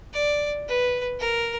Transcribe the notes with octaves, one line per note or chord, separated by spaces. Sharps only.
D5
B4
A#4